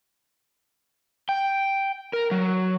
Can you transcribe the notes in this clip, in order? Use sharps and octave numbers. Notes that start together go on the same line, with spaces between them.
G5
A#4
F#3